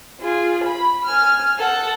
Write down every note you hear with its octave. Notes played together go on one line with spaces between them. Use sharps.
F4 G#4
B5
G#5 F6
A4 F#5